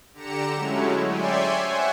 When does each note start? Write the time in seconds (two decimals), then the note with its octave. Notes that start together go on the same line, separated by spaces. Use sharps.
0.13 D3 G4 A#5 C#7 E7
0.55 F#3 G#3 A3 C#4 E4
1.07 C#5 D5 E5 G5 G#5 C6
1.61 C5 E5 F#5 G#5 C#6